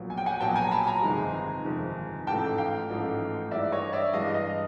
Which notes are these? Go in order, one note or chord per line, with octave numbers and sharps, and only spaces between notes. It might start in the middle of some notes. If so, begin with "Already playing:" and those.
Already playing: A#1 A#2 F#3 B3
G#5
G5
F#5 G#5
A#1 A#2 F#3 B3 G5 A5
G#5 A#5
A5 B5
G#5 A#5
G1 F2 C3 D#3 G#3
G1 F2 C3 D#3 G#3
A1 G#2 F3 A3 G5 A5
F5 G5
A1 G#2 F3 A3
G2 E3 G#3 D5 E5
C#5 D#5
D5 E5
G2 E3 G#3 D#5 F5
D#5 F5